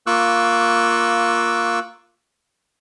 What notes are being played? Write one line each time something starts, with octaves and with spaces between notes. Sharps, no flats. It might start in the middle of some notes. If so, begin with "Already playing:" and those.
A#3 F4 C#6 D6 E6 F#6